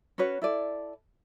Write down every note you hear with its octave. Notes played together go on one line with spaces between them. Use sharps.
C#4 F#4 B4 C#5
E4 A4 D5